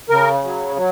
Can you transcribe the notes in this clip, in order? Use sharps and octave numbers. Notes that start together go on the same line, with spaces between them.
C#3 A#4
F#3
F#3